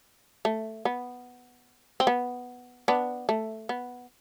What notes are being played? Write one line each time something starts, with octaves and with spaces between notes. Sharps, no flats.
A3
B3
C4
B3
B3 D4
A3
B3